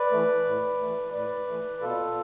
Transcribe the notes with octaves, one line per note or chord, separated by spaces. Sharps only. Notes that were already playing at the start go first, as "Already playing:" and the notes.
Already playing: B4 D5
E3 A3
A2
E3 A3
A2 B4 D5
E3 A3
B2 F4 A4